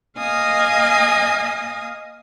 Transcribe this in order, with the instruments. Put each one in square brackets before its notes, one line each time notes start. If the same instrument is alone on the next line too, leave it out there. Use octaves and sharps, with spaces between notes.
[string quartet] A#3 D#5 F5 G#5 D#6